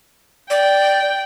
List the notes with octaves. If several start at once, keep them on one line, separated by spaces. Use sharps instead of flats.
D5 G5